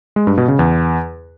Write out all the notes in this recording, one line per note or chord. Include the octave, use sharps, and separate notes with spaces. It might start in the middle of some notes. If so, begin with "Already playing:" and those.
G#3
G2
B2
C#3
E2